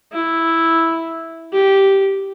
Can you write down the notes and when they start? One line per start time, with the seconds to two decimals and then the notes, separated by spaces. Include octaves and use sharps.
0.13 E4
1.53 G4